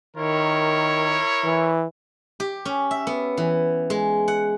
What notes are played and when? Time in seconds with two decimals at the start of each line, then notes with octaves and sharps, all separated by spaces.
0.17 D#3 E4 A#4 C#5
1.45 E3
2.40 G4
2.65 C#4
2.91 E5
3.07 B3
3.37 E3
3.90 G#3
4.28 F#5